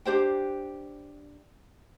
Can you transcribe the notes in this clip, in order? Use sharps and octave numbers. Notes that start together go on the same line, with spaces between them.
D4 G4 C5 G5